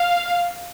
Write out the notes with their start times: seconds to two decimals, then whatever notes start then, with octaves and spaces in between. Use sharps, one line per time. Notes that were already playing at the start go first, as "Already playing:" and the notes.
Already playing: F5